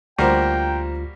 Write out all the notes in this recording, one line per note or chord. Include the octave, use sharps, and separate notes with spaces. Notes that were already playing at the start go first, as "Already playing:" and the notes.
D2 G3 A#3 F4 F#4 C5 G5 A#5